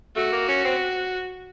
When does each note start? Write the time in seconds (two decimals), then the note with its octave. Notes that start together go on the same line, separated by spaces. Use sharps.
0.16 A3 F#4
0.32 A#3
0.48 C#4
0.64 C4